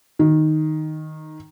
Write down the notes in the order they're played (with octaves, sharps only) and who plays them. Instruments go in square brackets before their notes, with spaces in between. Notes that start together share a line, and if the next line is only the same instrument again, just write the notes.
[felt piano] D#3